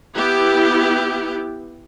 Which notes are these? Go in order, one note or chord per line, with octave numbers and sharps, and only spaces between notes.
B3 E4 G4